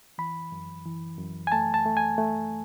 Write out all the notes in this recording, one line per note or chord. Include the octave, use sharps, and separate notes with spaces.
E3 B5
F#2
E3
F#2
G#5
A3 A5
A5
A3
G#5
A3